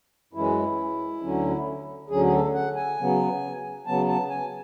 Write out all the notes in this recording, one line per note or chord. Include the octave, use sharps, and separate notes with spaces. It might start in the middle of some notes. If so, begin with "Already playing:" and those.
F#2 E3 G#3 C#4 E4
D2 D3 F#3 C#4
D2 D3 F#3 C#4 G#4
G#4
A4
F#5
G#5
C#3 F#3 B3
C#3 F#3 B3 A5
A5
G#5